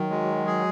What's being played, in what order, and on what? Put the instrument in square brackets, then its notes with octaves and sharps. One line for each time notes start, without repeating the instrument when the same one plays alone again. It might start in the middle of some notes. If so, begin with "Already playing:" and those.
Already playing: [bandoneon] D#3 [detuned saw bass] F#3
[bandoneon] G#3
G#4